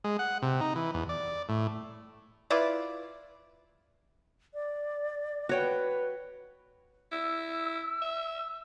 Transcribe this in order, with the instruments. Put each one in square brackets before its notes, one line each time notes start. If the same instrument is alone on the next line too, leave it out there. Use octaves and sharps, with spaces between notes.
[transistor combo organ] G#3
F#5
C3
D#4
E3
E2
D5
A2
[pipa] E4 F4 B4 D5
[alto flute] D5
[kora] F#4 C#5 G5 [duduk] B4
[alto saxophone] E4 [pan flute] E6
[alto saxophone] E5